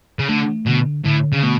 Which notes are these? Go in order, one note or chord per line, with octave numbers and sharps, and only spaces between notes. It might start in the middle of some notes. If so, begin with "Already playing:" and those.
C#3
D3 A3
B2 D3
A2 D3
C#3
B2 A3